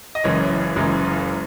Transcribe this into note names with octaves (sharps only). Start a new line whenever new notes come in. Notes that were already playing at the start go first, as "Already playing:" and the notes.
D#5
F#1 F#2 E3 G#3 C#5
F#1 F#2 E3 G#3